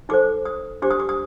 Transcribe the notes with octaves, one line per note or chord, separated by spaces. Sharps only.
D#4 A4 C5 D6
D#6
D4 G4 C5 D6
D#6
D6
D#6